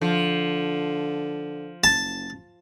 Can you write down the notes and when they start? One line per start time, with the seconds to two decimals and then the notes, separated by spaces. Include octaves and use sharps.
0.02 D3 F3
1.84 F#1 A5